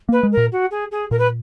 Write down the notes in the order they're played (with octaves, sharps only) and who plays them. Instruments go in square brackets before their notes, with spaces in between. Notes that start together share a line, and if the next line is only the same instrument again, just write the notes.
[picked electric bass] A#3 [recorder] B4
[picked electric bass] G#3
[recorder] A#4
[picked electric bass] A#2
[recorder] F#4
G#4
G#4
[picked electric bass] A#2 [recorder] A#4
[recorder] B4